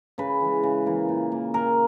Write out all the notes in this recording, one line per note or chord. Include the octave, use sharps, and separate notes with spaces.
C#3 B4
E3 G#3
C#3
E3 A#3
A#2
A#3
A#2 A#4